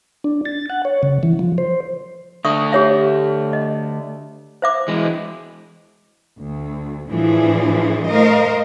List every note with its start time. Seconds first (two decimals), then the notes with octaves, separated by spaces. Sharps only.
0.24 D4
0.45 A6
0.70 F#5
0.85 C#5
1.03 C#3
1.23 E3
1.39 F3
1.58 C5
2.45 D3 A3 D4 E5 C#6 D#6
2.72 G4 C#5 E5
3.53 D#5
4.62 C5 E5 D6
4.88 E3 G#3
6.38 D2
7.09 A2 E3 F3 D4 G#4
8.07 A3 A#4 C5 D#5 F5